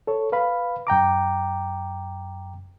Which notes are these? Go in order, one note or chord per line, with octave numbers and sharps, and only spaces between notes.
A4 C#5
B4 F5 B5
F#2 G5 A#5 D6